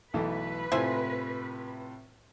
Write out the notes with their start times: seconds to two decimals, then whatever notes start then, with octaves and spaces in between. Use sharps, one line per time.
0.14 B1 E3 A3 B4
0.72 A2 C3 E4 F4 C5 G#5